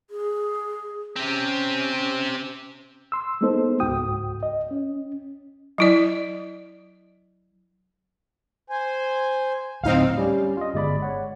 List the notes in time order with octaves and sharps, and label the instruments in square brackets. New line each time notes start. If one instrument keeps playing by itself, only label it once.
[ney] G#4
[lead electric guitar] C4 G4 [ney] C#4
[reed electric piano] C6 E6
G#3 A#3 B3 D#4 A4 C5
C#2 G#2 F#4 G5 D#6
D#5
C#4
[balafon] F#3 E4 D5
[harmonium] C5 G#5
[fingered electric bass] D2 A2 [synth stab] C4 D#4 F5
[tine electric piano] G3 C#4 D5
F4 D#5
G1 G#3 D5 B5
C#5 F#5